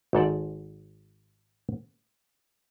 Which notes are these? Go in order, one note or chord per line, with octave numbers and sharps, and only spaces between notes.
G#1 G#2 A4 D5